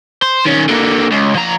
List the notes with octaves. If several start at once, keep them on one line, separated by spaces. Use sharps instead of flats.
C5
D#3 C#4
D3 A#3
C#2
F3 A#5